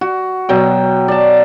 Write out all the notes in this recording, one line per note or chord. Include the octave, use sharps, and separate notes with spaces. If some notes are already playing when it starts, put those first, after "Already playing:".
F#4
B2 F#3 G5
D5 A5